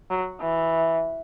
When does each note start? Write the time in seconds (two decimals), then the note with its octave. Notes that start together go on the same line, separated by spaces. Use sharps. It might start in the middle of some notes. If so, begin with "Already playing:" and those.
0.11 F#3
0.40 E3